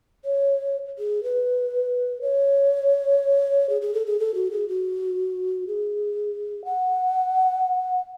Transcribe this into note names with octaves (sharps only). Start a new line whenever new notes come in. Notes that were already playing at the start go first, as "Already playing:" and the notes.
C#5
G#4
B4
C#5
G#4
G#4
A4
G#4
A4
F#4
G#4
F#4
G#4
F#5